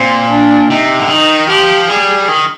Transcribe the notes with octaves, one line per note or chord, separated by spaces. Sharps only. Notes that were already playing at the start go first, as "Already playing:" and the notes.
Already playing: A#2 C4
D4
C3 D#4
D3
D#3 D#4
F3 G4
G3 G#4
D#3